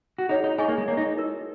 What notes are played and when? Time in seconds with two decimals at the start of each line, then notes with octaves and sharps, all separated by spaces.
0.18 F#4
0.29 D#4 G#4 C#5 F#5
0.44 D#4
0.58 D#4 G#4 D#5 G#5 C#6
0.68 A#3
0.78 G#3
0.87 A#3 G#4 C#5 A#5
0.97 D#4
1.17 D#4 F#4 A#4